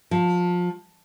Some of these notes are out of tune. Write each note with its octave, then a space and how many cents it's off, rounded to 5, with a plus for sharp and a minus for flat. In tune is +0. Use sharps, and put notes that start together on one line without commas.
F3 +25